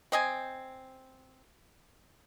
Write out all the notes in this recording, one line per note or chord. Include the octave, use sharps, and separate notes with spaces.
C4 D#5 G#5